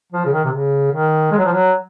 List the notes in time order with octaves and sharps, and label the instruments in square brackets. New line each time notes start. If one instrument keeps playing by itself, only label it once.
[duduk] F3
C#3
D#3
C3
C#3
D#3
G#3
F#3
F3
F#3